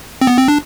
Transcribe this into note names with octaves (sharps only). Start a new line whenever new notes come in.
C4
B3
C4
D4